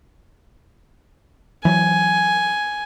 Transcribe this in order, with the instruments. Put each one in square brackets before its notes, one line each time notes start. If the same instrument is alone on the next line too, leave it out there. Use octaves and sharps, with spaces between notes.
[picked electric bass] E3 F#3 [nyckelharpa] G#5